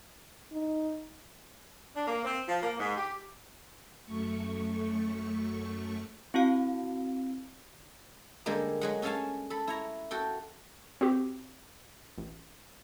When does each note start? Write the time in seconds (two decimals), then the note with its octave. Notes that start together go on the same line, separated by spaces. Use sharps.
0.52 D#4
1.94 D4
2.07 A#3
2.24 C4
2.48 F3
2.62 A#3
2.79 G#2
2.97 G4
4.04 F#2 A3 C#6
6.34 C4 E4 F#4 F5
8.46 D3 G3 G#3 A#3
8.81 F#3 G#3 F#5
9.02 C#4 A4 C#5 F5 G#5 A5
9.50 A4 B5
9.67 E4 C#5 A#5
10.11 F#4 A4 G5
11.01 C4 F#4 G4
12.18 A1